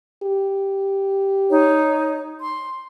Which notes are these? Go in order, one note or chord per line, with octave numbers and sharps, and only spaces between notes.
G4
D#4 C#5
C6